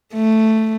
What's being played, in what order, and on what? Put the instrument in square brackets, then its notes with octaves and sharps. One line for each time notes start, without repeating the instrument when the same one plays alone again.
[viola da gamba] A3